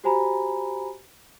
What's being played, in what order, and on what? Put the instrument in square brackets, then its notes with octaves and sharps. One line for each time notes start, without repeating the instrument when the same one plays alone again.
[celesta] F#4 G4 C5 G#5 A#5 B5